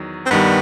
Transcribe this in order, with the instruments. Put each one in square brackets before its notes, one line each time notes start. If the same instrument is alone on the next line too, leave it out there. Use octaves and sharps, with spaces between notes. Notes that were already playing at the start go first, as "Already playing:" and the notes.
Already playing: [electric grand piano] E2 D#3 F#3
[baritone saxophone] C4
[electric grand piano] G2 D#3 G3 [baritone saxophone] B3